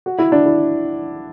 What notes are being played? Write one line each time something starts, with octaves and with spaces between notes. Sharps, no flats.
F#4
E4
D4
E4